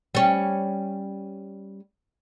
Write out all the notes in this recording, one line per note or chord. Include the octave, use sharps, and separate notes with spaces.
G3 C#4